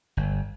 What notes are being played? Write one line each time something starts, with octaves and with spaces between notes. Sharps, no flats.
G1